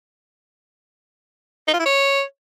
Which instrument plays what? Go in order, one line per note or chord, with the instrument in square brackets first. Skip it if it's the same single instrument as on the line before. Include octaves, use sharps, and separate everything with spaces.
[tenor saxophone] D#4
F4
E4
C#5